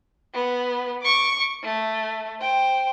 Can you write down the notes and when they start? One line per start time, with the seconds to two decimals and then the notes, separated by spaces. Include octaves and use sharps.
0.34 B3
1.02 C#6 D6
1.63 A3
2.41 C5 G5